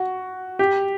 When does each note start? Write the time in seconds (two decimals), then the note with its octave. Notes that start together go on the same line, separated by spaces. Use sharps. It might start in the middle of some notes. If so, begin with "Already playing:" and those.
Already playing: F#4
0.59 G4